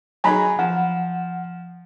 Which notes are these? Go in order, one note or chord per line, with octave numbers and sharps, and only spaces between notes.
F#3 D#4 G#4 G#5 A#5 B5
F3 F#5